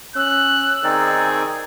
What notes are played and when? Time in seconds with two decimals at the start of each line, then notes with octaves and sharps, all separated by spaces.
0.16 C#4 E6 F#6
0.84 D#3 C4 D#4 G#4 D5